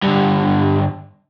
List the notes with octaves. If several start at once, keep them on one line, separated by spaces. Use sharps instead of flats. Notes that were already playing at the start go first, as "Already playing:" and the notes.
G2 D3